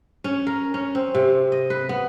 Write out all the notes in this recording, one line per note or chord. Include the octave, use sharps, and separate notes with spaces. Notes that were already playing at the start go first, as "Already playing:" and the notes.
C#4
A#4
C#4
C4
C3
D#5
B4
B3